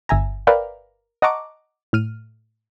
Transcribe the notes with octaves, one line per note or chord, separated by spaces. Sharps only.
G1 E5 G#5 A#5
A#4 B4 D5 E5 F5 G5
D#5 F#5 A5 A#5 C#6 D6
A2 F6 D#7